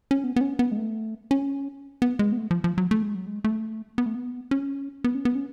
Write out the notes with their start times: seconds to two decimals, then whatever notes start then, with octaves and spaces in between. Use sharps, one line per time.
0.11 C#4
0.24 B3
0.36 B3
0.41 C#4
0.59 B3
0.72 G#3
0.77 A3
1.31 C#4
2.02 B3
2.19 G#3
2.32 B3
2.38 A3
2.51 F3
2.64 F3
2.78 F#3
2.91 A3
3.02 G#3
3.15 F#3
3.27 G#3
3.44 A3
3.98 B3
4.06 A3
4.15 B3
4.51 C#4
5.04 B3
5.15 C#4
5.25 B3
5.35 C#4